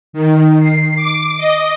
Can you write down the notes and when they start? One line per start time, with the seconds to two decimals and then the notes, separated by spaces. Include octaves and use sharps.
0.13 D#3
0.60 C7
0.96 D6
1.37 D#5